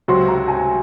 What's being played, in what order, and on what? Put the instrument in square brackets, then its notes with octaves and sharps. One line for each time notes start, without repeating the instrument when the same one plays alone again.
[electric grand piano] C#2 C3 F#3 C4 F#4 [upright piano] C6
[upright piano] A#5
G#5